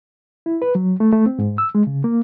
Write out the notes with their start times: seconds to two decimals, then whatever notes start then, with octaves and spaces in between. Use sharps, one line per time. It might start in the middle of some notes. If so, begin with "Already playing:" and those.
0.46 E4
0.62 B4
0.75 F#3
1.00 A3
1.13 A3
1.26 C4
1.39 G#2
1.58 E6
1.75 G#3
1.87 C#3
2.04 A#3